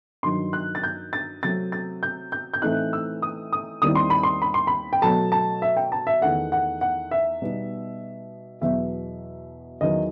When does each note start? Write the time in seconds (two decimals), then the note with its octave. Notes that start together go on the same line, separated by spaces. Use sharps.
0.23 G2 D#3 F#3 C6
0.53 F#6
0.75 A6
0.84 G6
1.13 A6
1.43 C3 F#3 A3 C4 A6
1.72 A6
2.03 G6
2.32 G6
2.54 G6
2.62 A2 E3 A3 C4 D#4 F#6
2.93 E6
3.22 D#6
3.53 D#6
3.82 D#2 D#3 G3 C4 E4 D#6
3.95 C6
4.10 B5
4.23 C6
4.42 B5
4.54 C6
4.67 B5
4.93 G5
5.02 B2 F#3 A3 A5
5.32 A5
5.62 E5
5.77 G5
5.92 A5
6.07 E5
6.21 E2 D#3 A3 F#5
6.52 F#5
6.81 F#5
7.11 E5
7.42 B2 G3 B3 D#4
8.61 E2 B2 F#3 B3 E5
9.81 E2 D#3 F#3 D#5